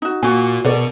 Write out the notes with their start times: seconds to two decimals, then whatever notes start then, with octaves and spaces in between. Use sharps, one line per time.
0.02 D#4 F#4
0.23 A#2 F#4 G#5
0.65 B2 G#4 A#4 D5